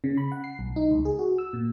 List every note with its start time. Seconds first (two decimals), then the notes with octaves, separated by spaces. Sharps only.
0.04 C#3
0.17 B5
0.32 F#5
0.44 C7
0.59 B1
0.76 D#4
0.91 C#2
1.05 G#4
1.19 F#4
1.38 E6
1.53 A#2